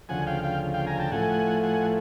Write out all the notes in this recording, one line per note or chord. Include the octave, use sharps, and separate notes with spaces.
D2 C#3 F3 F#5 G#5
F5 G5
F5 G5
F5 G5
G#5 A#5
G5 A5
A2 F3 A3 F#5 G#5
F#5 G#5